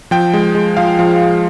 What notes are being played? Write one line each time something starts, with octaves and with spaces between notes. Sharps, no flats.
F3 G5
G#3
G#3
F3 F5
F3